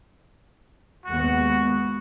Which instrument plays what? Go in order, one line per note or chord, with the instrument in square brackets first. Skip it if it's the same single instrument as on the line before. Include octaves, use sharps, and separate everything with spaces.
[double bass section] D#2 G#3 B3 [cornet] F#4